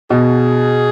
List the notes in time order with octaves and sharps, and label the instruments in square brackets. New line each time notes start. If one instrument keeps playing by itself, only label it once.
[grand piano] B2 [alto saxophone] G#4